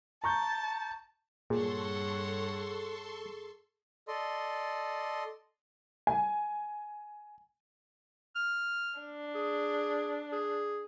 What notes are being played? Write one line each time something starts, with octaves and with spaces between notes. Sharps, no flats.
A5 A#5 C#6 G6
G2 A#2 G#4 A4 C#5 F#5 C6 C#6
A4 D5 D#5 C6
G#5
F6
D4
G#4
G#4